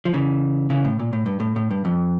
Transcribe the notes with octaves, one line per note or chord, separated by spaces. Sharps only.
F3
C#3 E3
C#3 E3
A2
A#2
A2
G2
A2
A2
G2
F2